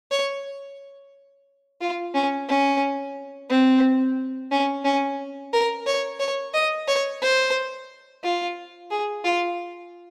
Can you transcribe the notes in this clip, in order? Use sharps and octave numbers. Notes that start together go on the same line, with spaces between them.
C#5
F4
C#4
C#4
C4
C#4
C#4
A#4
C#5
C#5
D#5
C#5
C5
F4
G#4
F4